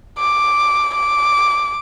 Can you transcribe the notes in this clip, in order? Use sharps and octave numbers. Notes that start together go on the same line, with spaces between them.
D6
D6